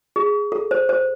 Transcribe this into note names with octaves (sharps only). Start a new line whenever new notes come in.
G#4
A4
C5
C5